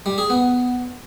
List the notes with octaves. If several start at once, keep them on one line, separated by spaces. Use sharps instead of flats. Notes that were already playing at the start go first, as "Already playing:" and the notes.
G3
G#4
B3